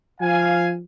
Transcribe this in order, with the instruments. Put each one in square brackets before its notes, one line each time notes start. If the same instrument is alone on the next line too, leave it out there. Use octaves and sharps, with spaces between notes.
[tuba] F3 [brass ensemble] F5 G#5